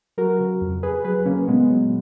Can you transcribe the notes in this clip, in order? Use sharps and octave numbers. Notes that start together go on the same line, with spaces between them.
F#3 F#4 A#4
C#3
F2
F2 G#4 B4
F#3 G#4 B4
C#3 A#3 C#4
A#2 G#3 B3
F#3